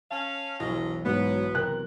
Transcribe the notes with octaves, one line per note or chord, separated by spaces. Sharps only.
C#4 F5 A5
E1 B1 E3 F#3 F4 D#5
G#2 F#3 B3
C3 A#4 F#6